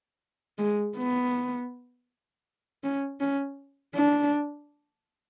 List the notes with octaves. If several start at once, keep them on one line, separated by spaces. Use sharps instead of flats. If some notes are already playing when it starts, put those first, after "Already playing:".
G#3
B3
C#4
C#4
D4